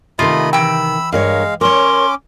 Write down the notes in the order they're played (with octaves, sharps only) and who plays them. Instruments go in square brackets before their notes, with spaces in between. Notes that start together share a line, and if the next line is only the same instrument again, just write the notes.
[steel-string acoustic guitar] C3 D#3 [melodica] A3 D#5 B5 [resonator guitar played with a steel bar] F4
[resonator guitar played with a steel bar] E3 G5 [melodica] B5 E6
[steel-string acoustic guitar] G2 A#4 C#5 [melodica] G#3 F5
[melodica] C#4 D6 [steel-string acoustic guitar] A#4 C#5 [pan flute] C6